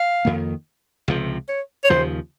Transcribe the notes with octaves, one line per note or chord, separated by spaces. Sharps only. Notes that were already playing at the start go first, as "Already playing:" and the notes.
Already playing: F5
F2 D#3 A#3
C#2 C3 F3
C#5
C#5
D#2 C#3 F3 C5